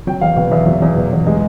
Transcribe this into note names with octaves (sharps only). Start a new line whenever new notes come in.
F#3 G5
E2 F5
B2 F5
E2 E5
F#3
E2
B2
E2
G#3 D#5